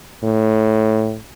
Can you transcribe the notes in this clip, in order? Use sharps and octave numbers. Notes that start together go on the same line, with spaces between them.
A2